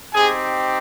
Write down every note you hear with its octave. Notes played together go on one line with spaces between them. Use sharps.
C4 D#4 G4 G#4 G#5